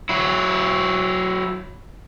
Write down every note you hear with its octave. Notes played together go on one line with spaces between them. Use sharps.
F#3 E4